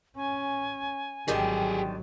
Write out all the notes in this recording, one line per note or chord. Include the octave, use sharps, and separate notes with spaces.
C#4 G#5
G#1 D3 D#3 F#3 G3 G4 G#4